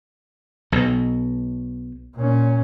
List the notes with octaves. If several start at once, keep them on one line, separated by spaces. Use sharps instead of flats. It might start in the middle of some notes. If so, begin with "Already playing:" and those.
B1 B2
A#2 C#4